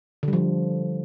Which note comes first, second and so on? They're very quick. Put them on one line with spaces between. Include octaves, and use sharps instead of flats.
D3 G3 F3